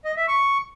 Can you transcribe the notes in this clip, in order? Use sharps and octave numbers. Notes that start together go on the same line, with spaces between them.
D#5
E5
C#6